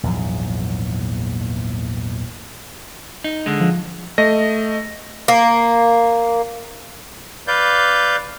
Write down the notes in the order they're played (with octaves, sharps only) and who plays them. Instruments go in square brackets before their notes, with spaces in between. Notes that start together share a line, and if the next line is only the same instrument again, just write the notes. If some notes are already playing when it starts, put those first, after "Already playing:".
[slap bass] A#1 E2 G#2 F#3
[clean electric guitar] D#4
D3 G#3
[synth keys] F3
[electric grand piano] A3 D#5 A#6
[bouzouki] A#3
[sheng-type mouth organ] B4 D5 F5 G6